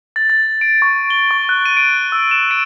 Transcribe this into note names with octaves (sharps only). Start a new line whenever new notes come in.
A6
A6
D7
C#6
G7
C#6
F#6
D#7
D7
E6
E7
D7